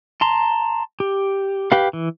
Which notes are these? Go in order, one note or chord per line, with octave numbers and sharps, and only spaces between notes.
A5 A#5 C6
G4
G4 B4 F5
E3